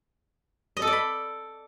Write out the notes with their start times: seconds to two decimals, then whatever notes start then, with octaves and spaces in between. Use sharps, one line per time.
0.77 D#5
0.82 A4
0.87 D5
0.93 B5